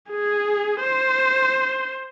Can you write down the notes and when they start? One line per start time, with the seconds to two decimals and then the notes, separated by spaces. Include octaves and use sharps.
0.10 G#4
0.81 C5